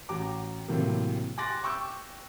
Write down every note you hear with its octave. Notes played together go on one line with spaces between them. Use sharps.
A1 F#4 G5 A#5 D6
A2 C3 E3 F#3 A#3
G#5 C6 D6 F#6 A6 A#6
G5 C#6 D6 E6 G6